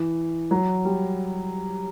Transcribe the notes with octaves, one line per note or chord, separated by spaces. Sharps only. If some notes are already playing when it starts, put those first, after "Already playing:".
Already playing: E3
F#3
G3